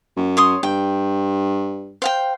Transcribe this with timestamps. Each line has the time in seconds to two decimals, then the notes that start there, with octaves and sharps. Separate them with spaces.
0.17 F#2
0.37 C#5 C6 D#6
0.63 G2 G5
2.02 C5 F5 G5